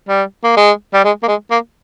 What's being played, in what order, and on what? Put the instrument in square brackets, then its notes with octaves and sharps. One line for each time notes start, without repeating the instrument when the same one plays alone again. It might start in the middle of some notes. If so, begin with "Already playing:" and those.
[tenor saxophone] G3
A#3
G#3
G3
G#3
A#3
G#3
A#3